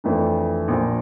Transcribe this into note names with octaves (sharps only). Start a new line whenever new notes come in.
F2 E3 A3 D4
A#1 A#2 F3